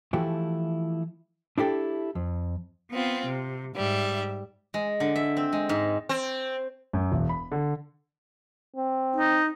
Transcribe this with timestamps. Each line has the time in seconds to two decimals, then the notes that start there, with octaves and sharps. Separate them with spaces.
0.13 E3 F3 A3 E4 F#4 G4
1.58 D4 E4 G4 A4
2.15 F2
2.92 B3 C4 F4
3.25 C3
3.75 G#2 G3 E5
4.74 G#3
5.00 D3
5.16 E5
5.37 C4
5.53 G#3
5.69 G#2
6.09 C4
6.93 F#2
7.12 E1
7.29 B5
7.52 D3
8.76 C4
9.16 D#4